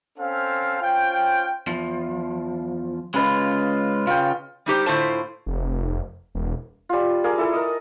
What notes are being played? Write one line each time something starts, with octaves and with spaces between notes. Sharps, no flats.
C4 C#4 A4 C5 F5
C#4 F4 C5 G5
E2 F3
C#3 G#3 F4 B4 D#5
C#3 F4 G5
G3 D#4 G4 C5
A2 D3 E4 F4 C5 A5
F1
E1
G3 F4
G#4 A#4 D5 F5
E4 A4 G#5
A#4 D#5